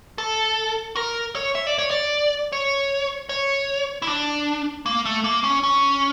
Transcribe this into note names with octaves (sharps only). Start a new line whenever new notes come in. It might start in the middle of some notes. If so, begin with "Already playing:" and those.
A4
A#4
C#5
E5
D5
C#5
D5
C#5
C#5
E4
D4
A#3
A3
A#3
C#4
C#4